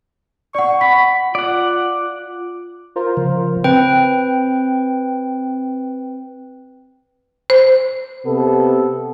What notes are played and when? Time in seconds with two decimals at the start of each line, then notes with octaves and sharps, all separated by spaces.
0.55 D5 F#5 C#6
0.81 F#5 B5 B6
1.35 F4 D5 F#5
2.96 F4 A#4 C5
3.17 C#3 F3
3.64 C4 B4 G5
7.50 C5
8.26 C3 B3 A4